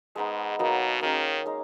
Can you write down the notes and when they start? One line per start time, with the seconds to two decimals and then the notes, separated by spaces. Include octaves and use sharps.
0.16 G#2 G#3 B3 D#4
0.59 B2 F#3 A#3 D#4
1.01 D#3 A#3 C#4 G#4
1.46 G#3 D#4